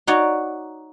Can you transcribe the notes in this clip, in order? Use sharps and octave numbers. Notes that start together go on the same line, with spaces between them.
D#4 F#4 C#5 D5